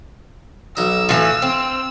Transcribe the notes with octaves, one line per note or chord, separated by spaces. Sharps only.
B1 D#4 E6
A2 E3 F4
C4